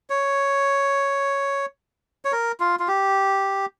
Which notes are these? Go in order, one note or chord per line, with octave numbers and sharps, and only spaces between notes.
C#5
C#5
A#4
F4
F4
G4